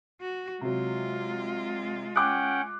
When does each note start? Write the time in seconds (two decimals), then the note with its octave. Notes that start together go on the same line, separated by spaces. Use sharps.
0.21 F#4
0.61 C3 F#3 G#3 F4
2.16 C#4 F#5 G5 D6 F#6